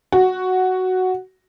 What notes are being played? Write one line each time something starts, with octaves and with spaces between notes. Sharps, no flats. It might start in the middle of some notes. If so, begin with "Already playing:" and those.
F#4